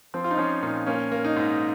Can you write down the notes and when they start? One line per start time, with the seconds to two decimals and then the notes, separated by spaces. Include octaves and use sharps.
0.14 F3 C4
0.24 F4
0.31 D#4
0.38 F3 C#4
0.63 A#2 D#4
0.86 A#3 C#4
1.12 A#3
1.25 D#4
1.36 G#2